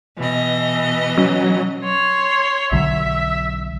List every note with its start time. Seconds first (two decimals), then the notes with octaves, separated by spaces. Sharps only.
0.17 B2 E3 D#5
1.18 F#3 C#4
1.84 C#5 C6
2.72 B1 D3 F#3 E5